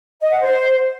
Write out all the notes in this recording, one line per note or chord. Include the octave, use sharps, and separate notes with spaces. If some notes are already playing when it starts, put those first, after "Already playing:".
D#5
F#5
C5